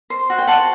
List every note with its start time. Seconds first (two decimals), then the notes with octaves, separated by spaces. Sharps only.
0.10 C5
0.30 F#4
0.38 G5
0.47 C5 F#5 A5